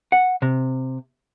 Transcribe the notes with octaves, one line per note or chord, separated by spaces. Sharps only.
F#5
C3